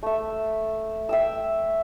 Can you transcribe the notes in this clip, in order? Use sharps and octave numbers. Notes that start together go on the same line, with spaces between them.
A3 E5
E5 G5 E6